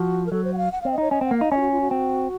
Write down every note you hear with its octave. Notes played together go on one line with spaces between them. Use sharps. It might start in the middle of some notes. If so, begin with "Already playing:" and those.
Already playing: F3 F#4
A#4
F#3 A4
C5
F#5
F5
F#5
C4 F5
D#5
D#4 C#5
C#4 D#5
C4 F#5
A#3
D#4 F5
C#4 D#5
F4
F#4
F4
F#4
C4